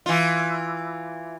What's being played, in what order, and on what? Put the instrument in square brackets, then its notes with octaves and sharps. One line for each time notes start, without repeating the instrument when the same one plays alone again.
[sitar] E3 F4